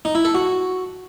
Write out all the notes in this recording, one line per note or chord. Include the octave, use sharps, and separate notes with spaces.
D#4
E4
A4
F#4